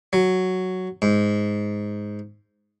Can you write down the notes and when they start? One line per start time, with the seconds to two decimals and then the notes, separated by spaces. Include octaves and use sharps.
0.13 F#3
1.02 G#2